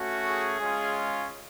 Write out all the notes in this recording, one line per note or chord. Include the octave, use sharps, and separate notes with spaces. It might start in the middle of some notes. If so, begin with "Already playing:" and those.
Already playing: A3 C#4 F#4
G#4
G#3 C#4 F4